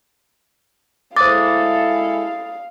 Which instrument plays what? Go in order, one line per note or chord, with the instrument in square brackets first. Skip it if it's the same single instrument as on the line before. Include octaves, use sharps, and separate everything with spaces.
[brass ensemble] G#3 E4 A4 [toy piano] C5 D6 [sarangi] F5 [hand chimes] D#6 A6